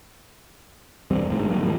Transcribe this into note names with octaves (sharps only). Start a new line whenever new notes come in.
E1 G2 G3 C4
G#1 D2 G#2
F#3 A#3
D#2 G#2 F3